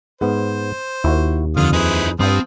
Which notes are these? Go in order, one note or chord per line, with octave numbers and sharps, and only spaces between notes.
G#2 B3 C5
D#2 E4 F#4
F2 D3 F4 D#6 F6
D#4 E4 G#4 B4 C5
G2 F3 B3 C4 D#6